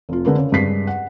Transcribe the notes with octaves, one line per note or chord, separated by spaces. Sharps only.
F1 F4
D3 G#3 A#4 B4
C#3
G2 G#3 B6 C7
F#5